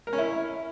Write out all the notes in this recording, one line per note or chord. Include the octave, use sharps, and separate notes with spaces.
A#4
C#4
E4